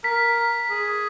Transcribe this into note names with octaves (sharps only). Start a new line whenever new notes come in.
A#4 B6
G#4